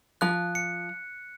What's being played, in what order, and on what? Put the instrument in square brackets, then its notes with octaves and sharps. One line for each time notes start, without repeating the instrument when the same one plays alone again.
[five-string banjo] F3 [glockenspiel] F#6
[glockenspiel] C#7